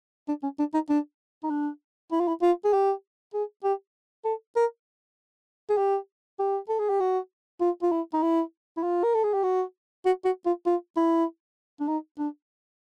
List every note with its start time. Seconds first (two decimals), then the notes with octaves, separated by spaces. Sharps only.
0.28 D4
0.43 C#4
0.59 D4
0.74 D#4
0.89 D4
1.43 D#4
1.50 D4
2.12 E4
2.20 F4
2.28 E4
2.42 F4
2.64 G#4
2.73 G4
3.34 G#4
3.64 G4
4.25 A4
4.56 A#4
5.69 G#4
5.77 G4
6.39 G4
6.69 A4
6.79 G#4
6.90 G4
7.00 F#4
7.61 F4
7.82 F4
7.92 E4
8.13 D#4
8.22 E4
8.77 E4
8.83 F4
9.04 A#4
9.14 A4
9.24 G#4
9.34 G4
9.44 F#4
10.05 F#4
10.25 F#4
10.46 F4
10.66 F4
10.97 E4
11.80 D4
11.88 D#4
12.19 D4